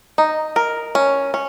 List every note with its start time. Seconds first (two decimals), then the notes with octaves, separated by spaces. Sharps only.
0.18 D#4
0.56 A#4
0.95 C#4
1.34 C#4